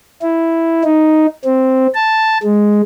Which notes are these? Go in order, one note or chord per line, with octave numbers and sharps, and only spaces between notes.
E4
D#4
C4
A5
G#3